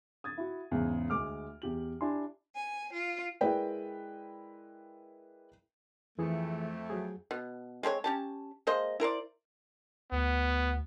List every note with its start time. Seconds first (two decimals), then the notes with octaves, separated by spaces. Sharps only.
0.24 D#6 G#6 A6
0.38 E4 F#4
0.71 E2 G#2 C#3
1.10 D2 G#3 D6 F6
1.62 E2 G4 F#7
2.01 D4 E4 G4 G#5 C6
2.54 G#5
2.92 F4
3.41 G#3 E4 A#4 B4 D5 G5
6.19 F2 E3 A3 G#4
6.90 F#3 G#4
7.31 B2
7.83 G#3 C4 A#4 C#5
8.04 C#4 G4 A5
8.67 G#3 A#3 C5 D#5
9.00 E4 A#4 C5 D5
10.12 D2 B3